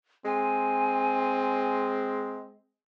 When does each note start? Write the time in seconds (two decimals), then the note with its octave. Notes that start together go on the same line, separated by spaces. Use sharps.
0.25 G#3 C4 G#5